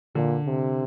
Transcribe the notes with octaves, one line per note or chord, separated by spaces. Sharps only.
A#2 D3
C3